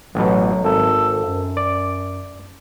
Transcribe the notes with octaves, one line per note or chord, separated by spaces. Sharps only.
A1 B2 F#3
G#1 A4
F#2
D5